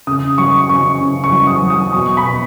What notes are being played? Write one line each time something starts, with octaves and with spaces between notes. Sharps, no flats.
C#3 D#6
F#3 C#6
C#3 C#6
C#3
C#6
F#3
D#6
F#3
D#6
B2 C#6
B5
B2